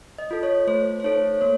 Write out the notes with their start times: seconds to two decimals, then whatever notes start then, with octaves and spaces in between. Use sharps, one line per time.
0.18 D#5
0.31 F4 A4
0.43 C#5
0.67 A3 C5
1.00 C5
1.04 D#4 A4 C#5
1.41 A#3 C#5